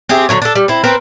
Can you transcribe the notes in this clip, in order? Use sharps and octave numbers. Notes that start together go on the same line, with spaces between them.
C4 G4 G#4 E5
D3 F#3 E4 C#5
D4 A4
G3
C4 E4
C4 A#4 B4